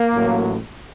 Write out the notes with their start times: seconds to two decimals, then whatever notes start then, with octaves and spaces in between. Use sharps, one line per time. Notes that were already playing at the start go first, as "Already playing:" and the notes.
Already playing: A#3
0.13 A1 A2 F#3